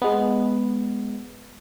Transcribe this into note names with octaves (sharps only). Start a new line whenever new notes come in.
G#3 B3